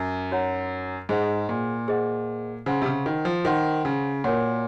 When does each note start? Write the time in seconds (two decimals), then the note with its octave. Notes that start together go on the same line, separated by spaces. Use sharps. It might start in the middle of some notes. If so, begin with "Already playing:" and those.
Already playing: F#2
0.30 D#4 F#4 C#5 F#5 A#5
1.09 G#2 G#4 C5 D#5 F#5
1.49 A#2
1.88 G#4 C5 D#5 F#5
2.66 C#3 C5 F#5 C6
2.82 C3
2.86 C#3
3.06 D#3
3.25 F3
3.45 D#3 C5 F#5 C6
3.85 C#3
4.24 A#2 F#4 A#4 C#5 F#5